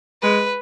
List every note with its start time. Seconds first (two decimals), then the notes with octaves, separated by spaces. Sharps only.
0.22 G#3 B4